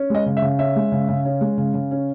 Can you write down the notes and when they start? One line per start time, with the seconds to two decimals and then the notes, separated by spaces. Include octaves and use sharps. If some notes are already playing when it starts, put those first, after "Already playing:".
Already playing: C#4
0.10 G#3 D#5
0.26 C#3
0.37 E5
0.42 C#3
0.59 C#4 E5
0.76 G#3
0.92 C#3
1.08 C#3
1.25 C#4
1.41 G#3
1.58 C#3
1.74 C#3
1.91 C#4